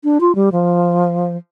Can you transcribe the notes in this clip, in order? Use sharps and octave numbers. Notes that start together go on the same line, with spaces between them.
D4
F4
G3
F3